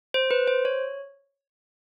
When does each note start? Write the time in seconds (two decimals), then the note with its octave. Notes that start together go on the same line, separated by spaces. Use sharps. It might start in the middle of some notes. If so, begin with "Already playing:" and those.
0.14 C5
0.31 B4
0.48 C5
0.65 C#5